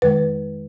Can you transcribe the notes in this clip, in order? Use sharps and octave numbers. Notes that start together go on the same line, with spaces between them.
F2 D#3 G#3 B4